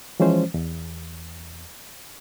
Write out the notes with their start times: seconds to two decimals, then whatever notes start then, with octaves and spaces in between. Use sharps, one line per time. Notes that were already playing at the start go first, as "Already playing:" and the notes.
0.20 E3 F3 G#3 C#4 C5
0.54 E2